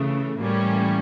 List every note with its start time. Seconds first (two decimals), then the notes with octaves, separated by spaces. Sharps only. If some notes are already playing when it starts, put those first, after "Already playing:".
Already playing: C#3 E3 A3
0.38 A2 E3 G3 A#3 C#4